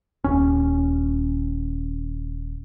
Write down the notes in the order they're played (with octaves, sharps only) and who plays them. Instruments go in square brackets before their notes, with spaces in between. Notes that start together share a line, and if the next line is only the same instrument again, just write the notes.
[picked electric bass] D#1 D#2 C#4